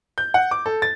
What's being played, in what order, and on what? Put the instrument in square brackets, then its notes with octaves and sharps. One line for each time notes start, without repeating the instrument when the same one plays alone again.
[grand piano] G6
F#5
D6
A4
A6